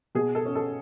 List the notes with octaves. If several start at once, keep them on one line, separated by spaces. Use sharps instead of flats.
B2 G#4
A4
C#4
A4